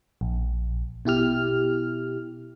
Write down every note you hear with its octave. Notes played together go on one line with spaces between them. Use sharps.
A#1
B2 E4 G4 F6